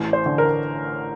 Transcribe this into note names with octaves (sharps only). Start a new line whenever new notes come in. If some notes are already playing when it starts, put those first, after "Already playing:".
Already playing: A1 A2
C5
D3
A#4